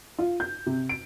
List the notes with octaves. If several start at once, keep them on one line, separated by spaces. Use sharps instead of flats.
F4
G6
C3
D7